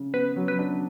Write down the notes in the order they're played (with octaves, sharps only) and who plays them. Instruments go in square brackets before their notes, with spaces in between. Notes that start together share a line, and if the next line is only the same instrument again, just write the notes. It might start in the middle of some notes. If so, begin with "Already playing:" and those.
Already playing: [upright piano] C#3
[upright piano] B3 [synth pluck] B4
[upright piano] F#3
[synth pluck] B4
[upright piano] D4